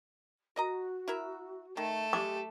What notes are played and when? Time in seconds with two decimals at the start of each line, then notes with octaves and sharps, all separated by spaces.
0.56 F#4 A#4 D#5 A#5
1.08 E4 A#4 E5
1.77 D#3 A3 A4
2.13 G#3 G4 D6